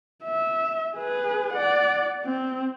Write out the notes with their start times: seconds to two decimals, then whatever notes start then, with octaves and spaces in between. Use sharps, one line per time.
0.24 E5
0.96 G#4 B4
1.53 D5 F#5
2.25 C4